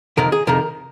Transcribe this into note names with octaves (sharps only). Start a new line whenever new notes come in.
F2 C3 D#3 A#4
G#4
F2 C3 D#3 A#4